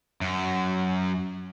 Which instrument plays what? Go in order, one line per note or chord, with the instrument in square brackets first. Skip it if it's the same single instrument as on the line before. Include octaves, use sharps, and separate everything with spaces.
[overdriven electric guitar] F#2